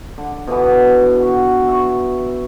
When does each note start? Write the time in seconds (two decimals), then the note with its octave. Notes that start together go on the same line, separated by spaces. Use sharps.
0.18 D3
0.47 B2 D3 E3 B3
1.22 F#4
1.68 E5 C#6